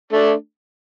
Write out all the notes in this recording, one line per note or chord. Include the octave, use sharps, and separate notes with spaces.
A3 D4